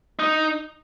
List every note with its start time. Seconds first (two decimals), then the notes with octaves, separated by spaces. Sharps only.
0.19 D#4